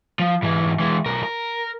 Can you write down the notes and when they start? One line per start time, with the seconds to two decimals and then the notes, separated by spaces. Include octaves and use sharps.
0.20 F3
0.43 G#2 E3
0.79 E3 G#3
1.06 B1 A#4
1.23 A#4